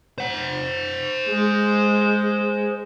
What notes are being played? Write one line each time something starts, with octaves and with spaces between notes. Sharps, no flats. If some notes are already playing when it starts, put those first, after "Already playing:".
C5 F#5
G#3